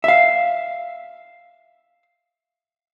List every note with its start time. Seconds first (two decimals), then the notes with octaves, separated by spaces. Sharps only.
0.04 E5 F5